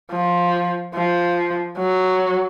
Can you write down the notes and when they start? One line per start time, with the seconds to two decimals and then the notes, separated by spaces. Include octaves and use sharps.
0.11 F3
0.95 F3
1.78 F#3